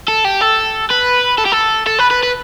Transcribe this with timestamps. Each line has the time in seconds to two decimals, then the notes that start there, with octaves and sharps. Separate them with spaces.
0.08 A4
0.24 G4
0.41 A4
0.90 B4
1.38 A4
1.46 G4
1.52 A4
1.87 A4
1.99 B4
2.10 B4
2.23 B4